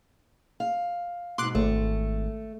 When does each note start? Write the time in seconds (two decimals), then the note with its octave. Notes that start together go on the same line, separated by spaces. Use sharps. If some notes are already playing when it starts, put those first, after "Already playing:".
0.60 F5
1.38 G#2 B2 C6 D6 F#6
1.55 G#1 A3